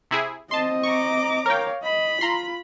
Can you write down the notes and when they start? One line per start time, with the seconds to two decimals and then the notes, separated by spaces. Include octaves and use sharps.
0.11 C3 E4 G#4
0.51 C4 D#5 A5 C6
0.83 A#5 C#6 D6
1.46 A#4 C#5 F5 G5
1.83 D#5 B5
2.21 F4 A#5 C6